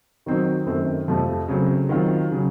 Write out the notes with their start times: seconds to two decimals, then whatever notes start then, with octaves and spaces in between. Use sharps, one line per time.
0.26 D#3 F#3 C4 D#4 F#4
0.67 F#2 D#3 A3 C4
1.08 F2 C3 F3 A3
1.48 C#3 F#3 A3 C4
1.89 D#3 F#3 C4 F4
2.31 C#3 F#3